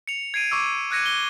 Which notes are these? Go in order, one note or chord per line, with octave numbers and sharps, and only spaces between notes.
C#7 F7
G#6 C7 D7 D#7
C#6 D6 E6
E6 F#6 G#6 A#6 C#7 D#7
G7